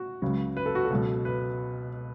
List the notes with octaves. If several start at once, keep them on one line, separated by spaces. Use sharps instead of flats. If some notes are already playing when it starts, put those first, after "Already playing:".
Already playing: F#4
C#2 C#3 F#3
B4
A4
F#4
A4
C#2 B2 F#3
B4